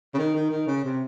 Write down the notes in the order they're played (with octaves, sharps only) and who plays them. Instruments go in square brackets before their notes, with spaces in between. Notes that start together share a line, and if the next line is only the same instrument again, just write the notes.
[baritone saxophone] C#3
D#3
D#3
D#3
C#3
C3